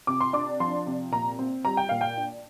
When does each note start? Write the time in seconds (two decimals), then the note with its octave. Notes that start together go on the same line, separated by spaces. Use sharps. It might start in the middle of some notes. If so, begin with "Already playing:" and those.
0.07 C3 D6
0.21 C6
0.33 D4 D6
0.60 F3 C6
0.86 C3
1.12 A#2 A#5
1.39 C4
1.65 G3 A#5
1.77 G5
1.89 A#2 F5
2.01 G5
2.17 D4